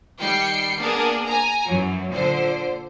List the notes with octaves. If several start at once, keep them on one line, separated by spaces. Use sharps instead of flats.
D#3 G3 G5 C7 C#7
A#3 B3 D4 G#4 A#4
G#5 A#5
F#2 E3 F#3
A#2 D3 C5